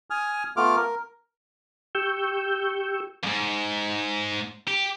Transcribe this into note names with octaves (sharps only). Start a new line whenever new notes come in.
G#5 D#6 F6
A3 B3 F4 D6 F6
A#4
G4 C#6 E6 G6
F2 G#2
G4